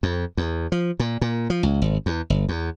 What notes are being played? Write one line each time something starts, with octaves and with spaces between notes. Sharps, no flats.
F2
E2
F3
A#2
A#2
F3
C#2
G#1
E2
G1
E2